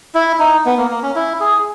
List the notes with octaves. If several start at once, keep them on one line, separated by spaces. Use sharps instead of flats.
E4
D#4
B3
A#3
A#3
C#4
E4
G#4